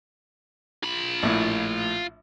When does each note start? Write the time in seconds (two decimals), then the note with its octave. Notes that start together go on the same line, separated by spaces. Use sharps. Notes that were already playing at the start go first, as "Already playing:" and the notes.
0.83 F4 B5
1.23 A#1 A2